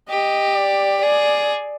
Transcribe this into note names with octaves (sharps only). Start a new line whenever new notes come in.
G4 D#5
D5
G#4 D5